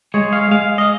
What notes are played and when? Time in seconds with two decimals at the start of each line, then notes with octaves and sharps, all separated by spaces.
0.14 G#3 C#5
0.33 F5
0.51 G#3 F5
0.78 D#5